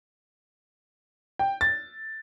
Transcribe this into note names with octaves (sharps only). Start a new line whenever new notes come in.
G5
A6